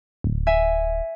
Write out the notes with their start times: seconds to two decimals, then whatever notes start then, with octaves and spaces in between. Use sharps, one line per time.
0.24 D1
0.47 E5 G#5